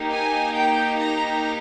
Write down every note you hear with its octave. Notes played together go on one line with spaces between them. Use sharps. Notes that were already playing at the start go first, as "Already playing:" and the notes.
Already playing: A#3 D#4 G4
G#5
G5
A#5